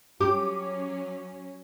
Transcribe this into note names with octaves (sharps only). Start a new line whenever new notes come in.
F#3 C#4 G4 D6